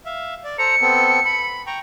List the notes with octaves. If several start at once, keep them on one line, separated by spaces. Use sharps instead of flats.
E5 F5
D5
A4 C5 A#5 C#7
B3 C4 A4
B5
G5 A#5 C#6